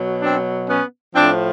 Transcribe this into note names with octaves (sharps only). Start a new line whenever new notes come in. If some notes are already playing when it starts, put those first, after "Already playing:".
Already playing: B2 F#3
C4 D4
B3 C#4
A2 F3 C4 D4